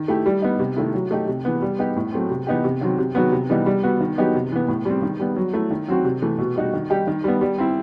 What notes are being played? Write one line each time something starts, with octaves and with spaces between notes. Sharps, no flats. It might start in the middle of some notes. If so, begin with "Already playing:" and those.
Already playing: D#3
A3 E4 G4
G3
B3 D#4
C3
D#3 A3 E4
F#3
A3 D#4 G4
C3
E3 B3
G3
B3 D#4 G4
A2
F#3 A3 C4
C3
E3 B3 D#4 G4
C3
D#3 F#3 C4
C3
D#3 F#3 B3
C3
E3 G3 B3 D#4
G3
B3 F#4
D#3
F#3 B3 D#4 G4
C3
E3 B3
A2
G3 C4
D#3
G3 B3
F#3
A3 E4
D#3
F#3 C4 F#4
C3
E3 A3
B2
G3 D#4 F#4
D#3
G3 D#4 G4
D#3
G3 B3
G3
C4 E4